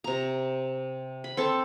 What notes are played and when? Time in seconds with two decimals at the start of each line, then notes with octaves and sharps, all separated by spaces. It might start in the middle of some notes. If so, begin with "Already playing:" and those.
0.04 C3 A#5
1.24 B5
1.37 C4 A4 A5